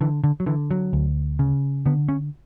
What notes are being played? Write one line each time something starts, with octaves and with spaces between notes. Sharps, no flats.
D3 E3
D3
F#3
D3 E3
F#3
D2
C#3
D3 B3
C#4